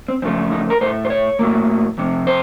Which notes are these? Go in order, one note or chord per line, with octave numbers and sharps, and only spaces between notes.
C4
F#2 C#3 F3 A3 C4
D#4
A#4
A2 A3 C5
C5
C#5
A2 F#3 A#3
F2 C3
C5